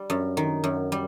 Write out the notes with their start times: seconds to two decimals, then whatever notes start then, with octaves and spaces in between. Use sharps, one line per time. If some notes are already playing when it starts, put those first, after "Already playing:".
Already playing: G3
0.10 F#2
0.37 D#3
0.64 F#2
0.92 G3